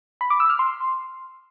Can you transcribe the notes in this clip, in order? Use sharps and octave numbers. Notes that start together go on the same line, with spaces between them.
B5
D6
E6
F6
C6